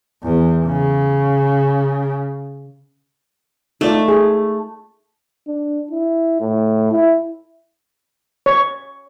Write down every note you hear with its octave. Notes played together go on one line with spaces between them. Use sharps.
E2
C#3
A3 D#4 F4 D5
G#4
D4
E4
A2
E4
C#5